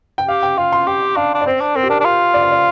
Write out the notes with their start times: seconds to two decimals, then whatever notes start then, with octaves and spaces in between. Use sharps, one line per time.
0.18 G5
0.28 G4 F5
0.43 G5
0.58 F4 F5
0.73 C6
0.87 G4 G5
1.16 D4 F5
1.35 D4
1.41 D5
1.46 C4 C5
1.60 D4
1.75 C4 A#4
1.83 G4
1.90 D4 A#4
2.00 D4
2.05 F4
2.34 D5
2.43 F5
2.51 D5